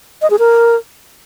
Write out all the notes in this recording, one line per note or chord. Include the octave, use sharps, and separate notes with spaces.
D#5
G#4
A#4